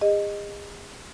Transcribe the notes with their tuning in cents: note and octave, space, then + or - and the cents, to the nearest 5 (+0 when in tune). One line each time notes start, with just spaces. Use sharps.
G#4 -40 D#5 -10